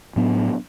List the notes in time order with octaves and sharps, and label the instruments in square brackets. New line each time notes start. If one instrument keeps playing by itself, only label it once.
[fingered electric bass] A2 F#3 B3 D4